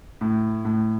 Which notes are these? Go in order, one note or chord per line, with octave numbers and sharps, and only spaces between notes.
A2
A2